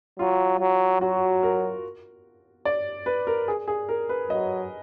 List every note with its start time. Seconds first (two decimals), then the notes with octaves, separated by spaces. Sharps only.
0.19 F#3 F4
0.60 F#3
1.01 F#3 F#4
1.43 A#4
2.65 D5
3.06 B4
3.27 A#4
3.48 G#4
3.68 G#4
3.89 A#4
4.09 B4
4.30 F#3 D#5